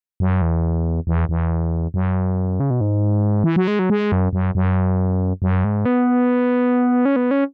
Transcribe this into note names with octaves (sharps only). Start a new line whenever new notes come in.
F#2
E2
E2
E2
F#2
C#3
B2
G#2
E3
F#3
G#3
F#3
G#3
F#2
F#2
F#2
F#2
G#2
B3
C#4
B3
C#4